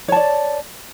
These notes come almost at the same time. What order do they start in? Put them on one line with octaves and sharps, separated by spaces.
C#5 A5 D5